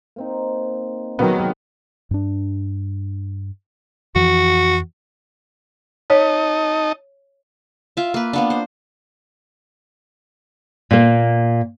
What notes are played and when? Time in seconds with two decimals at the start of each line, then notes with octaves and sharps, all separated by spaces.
0.16 A#3 C4 D#4
1.19 C3 D#3 F#3 G#3 B3 F#4 F#5
2.11 G2 D4
4.15 F2 E3 F3 F#4
6.10 D#4 C#5 D#5 A5
7.97 F4 E5
8.14 A#3 B4
8.33 A#3 B3 D4
8.50 C5
10.91 A#2 A#3